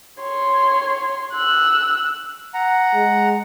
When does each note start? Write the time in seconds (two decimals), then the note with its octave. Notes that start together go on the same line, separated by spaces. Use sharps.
0.21 C#5 C6
1.34 E6 F#6
2.54 F#5 A#5
2.94 G#3